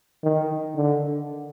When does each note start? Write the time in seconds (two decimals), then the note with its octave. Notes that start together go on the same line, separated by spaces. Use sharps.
0.24 D#3
0.76 D3